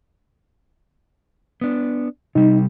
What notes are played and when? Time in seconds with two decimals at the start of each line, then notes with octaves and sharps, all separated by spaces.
1.61 B3 D4
2.35 C3 G3 D#4